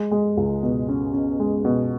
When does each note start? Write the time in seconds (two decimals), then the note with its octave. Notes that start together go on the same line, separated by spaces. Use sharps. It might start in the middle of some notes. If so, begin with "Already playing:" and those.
Already playing: G#3
0.11 G#3
0.37 C#2
0.63 B2
0.88 C#4
1.13 C#4
1.40 G#3
1.65 B2